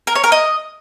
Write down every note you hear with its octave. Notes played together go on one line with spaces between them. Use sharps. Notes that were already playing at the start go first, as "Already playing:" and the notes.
A#4
C#5
A#4
D#5